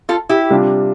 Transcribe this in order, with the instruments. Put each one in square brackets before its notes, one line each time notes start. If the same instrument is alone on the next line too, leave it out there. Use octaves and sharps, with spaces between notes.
[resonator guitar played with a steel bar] F4 A4
E4 G4
[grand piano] C3 G3 D4 F4